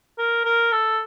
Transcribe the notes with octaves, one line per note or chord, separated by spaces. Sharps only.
A#4
A#4
A4